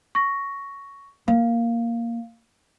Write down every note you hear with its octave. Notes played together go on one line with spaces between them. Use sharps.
C#6 A#6
A#3 F5